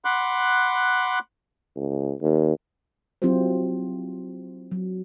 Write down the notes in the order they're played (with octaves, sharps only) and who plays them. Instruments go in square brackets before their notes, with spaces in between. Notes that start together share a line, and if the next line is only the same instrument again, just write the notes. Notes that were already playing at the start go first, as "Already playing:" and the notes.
[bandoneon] F#5 B5 C6 D6 F#6
[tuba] C#2
D#2
[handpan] F#3 C4 E4 F4 G4 C5
F#3